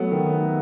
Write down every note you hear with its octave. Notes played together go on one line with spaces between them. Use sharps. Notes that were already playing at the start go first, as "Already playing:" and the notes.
Already playing: F#3 A3 B3
D#3